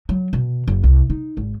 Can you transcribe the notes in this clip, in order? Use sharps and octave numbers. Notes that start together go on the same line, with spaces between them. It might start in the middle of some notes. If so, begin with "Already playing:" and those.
F#3
B2
F#1
C2
D#4
G#1